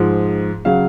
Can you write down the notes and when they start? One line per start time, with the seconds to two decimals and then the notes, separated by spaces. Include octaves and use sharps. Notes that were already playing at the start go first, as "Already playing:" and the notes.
Already playing: G#2 F3 G#3
0.65 C#3 F#3 F5